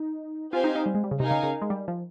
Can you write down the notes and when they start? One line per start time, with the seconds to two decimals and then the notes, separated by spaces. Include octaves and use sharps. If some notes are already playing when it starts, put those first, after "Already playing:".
Already playing: D#4
0.53 C4 F4 G4 C5 F5 G#5
0.64 D#4
0.75 D#4
0.86 G3
0.95 G#3
1.04 G3
1.11 C#3
1.20 C3 D#4 A#4 F5 G#5
1.31 C#3
1.43 C#3
1.62 G#3
1.70 G3
1.88 F3